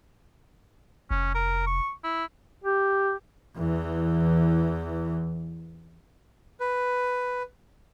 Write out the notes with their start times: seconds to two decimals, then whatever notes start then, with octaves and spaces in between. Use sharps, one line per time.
1.11 F1 C#4
1.34 A#4
1.66 C#6
2.04 E4
2.64 G4
3.57 E2 E3
6.60 B4